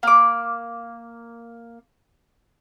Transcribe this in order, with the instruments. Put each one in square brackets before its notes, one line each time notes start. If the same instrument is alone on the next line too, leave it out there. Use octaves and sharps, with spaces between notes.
[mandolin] A#3 D6